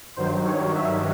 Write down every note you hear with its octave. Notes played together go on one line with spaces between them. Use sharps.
G2 D#3 F#3 C5
C#5
E5